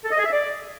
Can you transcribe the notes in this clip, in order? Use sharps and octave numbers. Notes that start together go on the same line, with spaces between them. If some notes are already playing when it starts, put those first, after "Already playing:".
A4
D#5
G#4
E5
D5